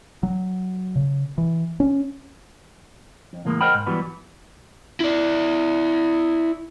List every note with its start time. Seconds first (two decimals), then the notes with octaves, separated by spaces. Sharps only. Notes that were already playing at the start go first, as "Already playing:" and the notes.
0.23 F#3
0.96 C#3
1.38 E3
1.80 C#4
3.33 F2
3.45 C#2 A2 E3 G#3 A#3
3.61 A#4 C5 D#5 F#5 G5 B5
3.74 G#2
3.86 E3 F#3 G3 B3 B4
5.00 E4 D5